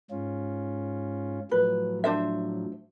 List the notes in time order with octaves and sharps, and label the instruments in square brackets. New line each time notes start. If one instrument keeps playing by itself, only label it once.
[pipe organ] G#2 C#4 F4
[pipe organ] A2 F3 F#3 [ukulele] B4
[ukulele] D4 C5 E5